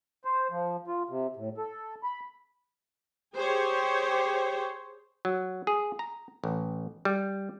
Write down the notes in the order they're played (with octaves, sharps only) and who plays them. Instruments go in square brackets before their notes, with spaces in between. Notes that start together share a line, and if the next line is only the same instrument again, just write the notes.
[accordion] C5
F3
F4
C3
A2
A4
B5
[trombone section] G4 [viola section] G#4 C5 C#5
[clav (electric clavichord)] F#3
G#4
A#5
A1
G3